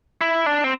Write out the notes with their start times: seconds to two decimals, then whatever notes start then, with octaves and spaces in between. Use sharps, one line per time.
0.21 E4
0.46 D4
0.64 C4